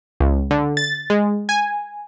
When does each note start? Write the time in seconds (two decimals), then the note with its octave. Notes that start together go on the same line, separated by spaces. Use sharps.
0.20 C#2
0.51 D3
0.77 A6
1.10 G#3
1.49 G#5